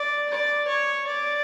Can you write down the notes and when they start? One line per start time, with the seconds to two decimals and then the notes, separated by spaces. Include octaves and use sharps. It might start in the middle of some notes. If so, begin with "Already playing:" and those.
Already playing: D5
0.30 D5
0.68 C#5
1.07 D5